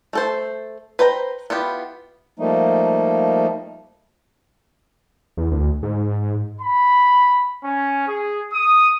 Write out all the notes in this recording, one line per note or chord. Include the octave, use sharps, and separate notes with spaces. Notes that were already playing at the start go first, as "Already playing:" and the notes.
A3 A4 C5
B4 C5 G5 A#5
B3 E4 F4 G4
F3 G3 A3 A#3 D#4
E2
D2
G#2
B5
C#4
G#4
D#6